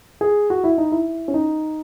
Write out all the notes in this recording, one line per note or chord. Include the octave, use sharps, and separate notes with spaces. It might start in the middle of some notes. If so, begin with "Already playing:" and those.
G#4
F#4
E4
D#4
E4
C#4
D#4